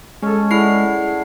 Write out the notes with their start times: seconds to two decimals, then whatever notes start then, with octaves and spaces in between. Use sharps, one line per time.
0.22 G#3 C#4 A4
0.51 E4 G#4 D5 F#5 C7